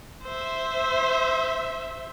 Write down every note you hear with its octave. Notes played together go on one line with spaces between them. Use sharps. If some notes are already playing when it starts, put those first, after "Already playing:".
C5 E5